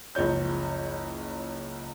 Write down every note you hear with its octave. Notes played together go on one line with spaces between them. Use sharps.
F#1 C#2 F3 C#5 G6